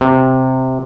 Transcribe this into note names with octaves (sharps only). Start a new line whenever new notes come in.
C3